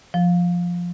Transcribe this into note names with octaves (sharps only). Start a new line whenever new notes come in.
F3